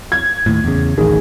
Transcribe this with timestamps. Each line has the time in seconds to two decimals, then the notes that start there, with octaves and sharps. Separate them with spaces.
0.12 G#6
0.46 D#2 A2
0.64 E2 C#3
0.98 D1 A1 D#3 G#4